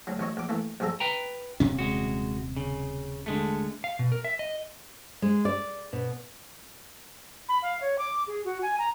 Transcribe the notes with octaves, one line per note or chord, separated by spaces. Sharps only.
D2 F#3
A1 B3 C#5 D#5
A#1 D6
E3 A3 A#3
A#1 G2 F3 G#4 A4 A#5
B4 G5 A#5
D#1 C3 C#4
G#3 F#4
C#3
D3 G#3 A3
F5
B2
A#4
E5
D#5
G#3
D5
B2
B5
F5
C#5
D6
G#4
F#4
G#5
A#5